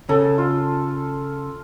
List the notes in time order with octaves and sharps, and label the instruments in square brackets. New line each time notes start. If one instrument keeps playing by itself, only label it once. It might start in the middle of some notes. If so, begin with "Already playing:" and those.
[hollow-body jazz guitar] C#3 [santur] A4
[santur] F4